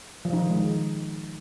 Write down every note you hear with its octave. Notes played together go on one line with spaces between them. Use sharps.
F3
D#4
D#3
G#3